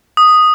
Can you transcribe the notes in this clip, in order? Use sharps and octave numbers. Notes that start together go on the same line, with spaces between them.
D#6